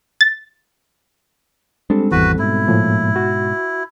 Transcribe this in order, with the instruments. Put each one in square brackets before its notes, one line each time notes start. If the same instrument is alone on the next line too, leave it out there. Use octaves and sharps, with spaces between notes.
[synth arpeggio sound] A6
[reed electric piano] G3 C4 A4 [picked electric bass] G#3 D4
[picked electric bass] G#1 E2 E3 [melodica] F#4 B4
[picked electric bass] G#2 B2 [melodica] E4
[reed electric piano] A2 F3 A#3
F#4